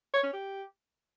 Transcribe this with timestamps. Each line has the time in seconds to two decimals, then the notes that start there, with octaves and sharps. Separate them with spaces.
0.14 C#5
0.24 C#4
0.33 G4